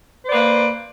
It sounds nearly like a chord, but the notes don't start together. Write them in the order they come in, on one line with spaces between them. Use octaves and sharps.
C5 D5 B4 A#3